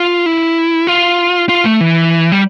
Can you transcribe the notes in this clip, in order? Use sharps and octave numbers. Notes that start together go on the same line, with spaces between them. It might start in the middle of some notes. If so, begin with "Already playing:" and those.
Already playing: F4
E4
F4
F4
A3
E3
G3